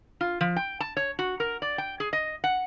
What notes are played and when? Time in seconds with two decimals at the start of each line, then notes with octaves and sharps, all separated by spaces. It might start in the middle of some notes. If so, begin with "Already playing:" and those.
0.21 F4
0.41 F3
0.56 G5
0.80 A5
0.97 C#5
1.19 F#4
1.40 A#4
1.62 D5
1.78 G5
2.00 G#4
2.13 D#5
2.44 F#5